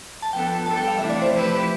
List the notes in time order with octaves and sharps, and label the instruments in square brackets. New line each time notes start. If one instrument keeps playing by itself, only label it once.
[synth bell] A5
[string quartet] F3 B3 D4 A4 [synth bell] G5
[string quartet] G3 D4 A4 [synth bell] A5
[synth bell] G5
F5
[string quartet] C3 E3 A3 D4 [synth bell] E5
[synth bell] D5
C5
[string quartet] F3 A3 E4 G4 B4